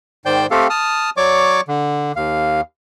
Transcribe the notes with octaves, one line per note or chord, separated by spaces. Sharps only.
G#2 D#3 C5 D5 G5 G6
A3 C4 G4 A4 F5
A5 D#6 F6
F#3 C#5 D5 C#6 D6
D3
D#2 F5